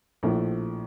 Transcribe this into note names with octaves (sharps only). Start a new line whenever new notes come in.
A#1 A2 F3 A3